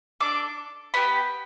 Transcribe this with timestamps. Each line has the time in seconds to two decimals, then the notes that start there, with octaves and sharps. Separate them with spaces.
0.20 D4 A4 D6
0.94 B3 G4 B5